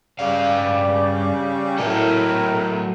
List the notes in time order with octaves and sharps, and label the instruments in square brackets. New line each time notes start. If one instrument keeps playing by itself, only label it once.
[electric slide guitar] G2 F5 [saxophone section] C#3 G3 [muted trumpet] D5
[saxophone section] A2 [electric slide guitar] F#3 A4 [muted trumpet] A#4